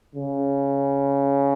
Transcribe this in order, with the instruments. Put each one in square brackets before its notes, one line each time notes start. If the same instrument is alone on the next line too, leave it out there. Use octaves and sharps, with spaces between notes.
[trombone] C#3